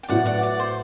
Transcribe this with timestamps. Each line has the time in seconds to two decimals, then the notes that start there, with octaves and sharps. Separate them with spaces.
0.03 G5
0.08 A2 F#3 B3 F#4 D5 F#5
0.26 D5 F#5
0.43 D5
0.59 C5